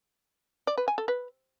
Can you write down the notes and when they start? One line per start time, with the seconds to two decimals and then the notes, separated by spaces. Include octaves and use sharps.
0.67 D5
0.78 B4
0.88 G#5
0.98 A4
1.08 B4